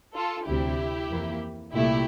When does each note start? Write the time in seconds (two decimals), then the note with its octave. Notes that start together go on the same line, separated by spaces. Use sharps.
0.14 F4 A4
0.46 D2 C3 G3 E4 G4
1.09 F2 E3 A#3
1.73 C2 A#2 A3 E4 G4